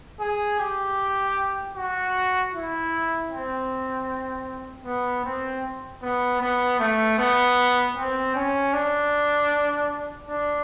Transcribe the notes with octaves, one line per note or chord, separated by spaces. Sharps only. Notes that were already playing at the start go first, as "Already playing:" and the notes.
G#4
G4
F#4
E4
C4
B3
C4
B3
B3
A3
B3
C4
C#4
D4
D4